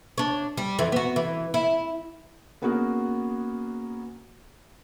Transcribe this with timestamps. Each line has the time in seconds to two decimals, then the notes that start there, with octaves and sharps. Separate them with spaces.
0.18 D4 C#5
0.57 G3
0.79 F2 E3
0.92 B3 F#4
1.16 E3
1.54 E4
2.62 A#3 B3 C#4 F#4 G#4 A#4